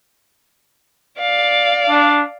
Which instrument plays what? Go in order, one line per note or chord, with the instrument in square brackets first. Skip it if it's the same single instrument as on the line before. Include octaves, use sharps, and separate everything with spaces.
[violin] D5 F5
[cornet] D4